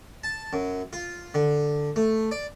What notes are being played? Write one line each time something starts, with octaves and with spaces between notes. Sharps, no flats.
A5
F#2
F4
D3
A3
D5